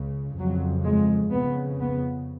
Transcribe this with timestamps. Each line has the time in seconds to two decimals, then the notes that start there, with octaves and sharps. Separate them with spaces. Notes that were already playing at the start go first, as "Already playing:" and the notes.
Already playing: C#2 C#3
0.38 F2 C#3 F#3
0.85 G#3
1.32 F2 C#3 B3
1.80 B3